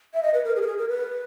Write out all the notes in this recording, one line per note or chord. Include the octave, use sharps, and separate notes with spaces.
E5
D#5
B4
A#4
G#4
A#4
G#4
A#4
B4